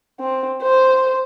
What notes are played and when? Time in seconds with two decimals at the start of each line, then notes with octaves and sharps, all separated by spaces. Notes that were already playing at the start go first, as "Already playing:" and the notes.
0.20 C4
0.62 C5